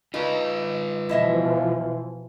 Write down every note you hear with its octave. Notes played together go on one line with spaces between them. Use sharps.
D#4 F4 B4
B2 E3 F3 E4 D#5 E5